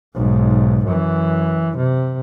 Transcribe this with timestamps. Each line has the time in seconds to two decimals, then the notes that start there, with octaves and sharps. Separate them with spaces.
0.15 B1 G#2
0.86 F#2 E3
1.77 C3